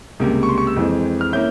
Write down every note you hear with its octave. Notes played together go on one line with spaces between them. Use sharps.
C#2 C3 G3 A#3
C#6
C6
C#6
E6
F2 E3 G#3 C4
F6
A#3 C#4 E4 G6